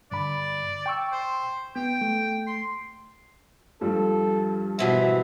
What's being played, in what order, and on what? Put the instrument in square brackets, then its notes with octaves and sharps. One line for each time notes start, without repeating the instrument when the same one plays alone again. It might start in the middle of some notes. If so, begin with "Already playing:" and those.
[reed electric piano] G2 D3 B5 [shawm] D5
[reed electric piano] G5 C#6 E6
[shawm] C5
[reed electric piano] B3 [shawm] G5
[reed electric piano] A3
[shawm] C6
[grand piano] G2 F3 G3 [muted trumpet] A4
[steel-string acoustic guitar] G#2 B2 E3 [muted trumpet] E5